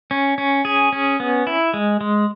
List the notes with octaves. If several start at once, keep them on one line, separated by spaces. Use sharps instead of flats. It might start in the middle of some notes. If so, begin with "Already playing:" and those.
C#4
C#4
G#4
C#4
B3
E4
G#3
G#3